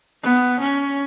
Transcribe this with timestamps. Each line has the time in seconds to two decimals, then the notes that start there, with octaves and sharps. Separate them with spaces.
0.23 B3
0.60 C#4